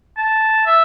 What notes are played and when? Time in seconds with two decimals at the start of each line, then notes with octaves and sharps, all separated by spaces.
0.17 A5
0.66 E5